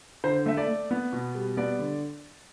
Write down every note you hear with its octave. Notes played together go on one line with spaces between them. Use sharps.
D3 C5
A3 E5
D5
A3
B3
B2
G3
B3 D5
D3